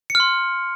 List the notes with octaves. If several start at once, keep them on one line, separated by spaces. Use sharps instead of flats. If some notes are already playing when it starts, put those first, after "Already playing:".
C#7
F6
C6